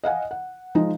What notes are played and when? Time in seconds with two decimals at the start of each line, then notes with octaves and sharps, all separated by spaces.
0.03 D#5 F5 F#5 G#5
0.31 F#5
0.75 F3 G#3 D#4